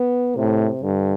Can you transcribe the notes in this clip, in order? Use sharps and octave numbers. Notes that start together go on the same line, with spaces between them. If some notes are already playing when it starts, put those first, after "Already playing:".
Already playing: B3
A2 C3
G2 D3